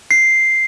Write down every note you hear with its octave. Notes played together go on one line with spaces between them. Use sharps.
C7